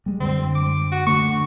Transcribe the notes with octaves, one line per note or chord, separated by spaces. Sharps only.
G3 G#3
F#2 D3 C4
D6
F#4
D3 A3 C#6